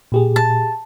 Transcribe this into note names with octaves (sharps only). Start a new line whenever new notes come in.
A#2 G4 G#4
A5